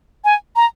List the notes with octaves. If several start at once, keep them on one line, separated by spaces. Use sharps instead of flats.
G#5
A#5